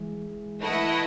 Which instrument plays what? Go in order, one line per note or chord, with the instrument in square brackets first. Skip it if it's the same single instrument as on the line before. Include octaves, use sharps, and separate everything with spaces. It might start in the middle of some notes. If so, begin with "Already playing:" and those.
Already playing: [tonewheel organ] E3 G#3
[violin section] A3 E4 B4 D#5 F#5